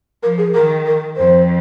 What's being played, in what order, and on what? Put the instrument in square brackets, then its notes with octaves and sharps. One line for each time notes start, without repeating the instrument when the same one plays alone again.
[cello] F3 [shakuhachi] A#4
[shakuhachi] G#4
[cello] D#3 [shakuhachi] A#4
[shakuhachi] A#4
[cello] F2 [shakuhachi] C5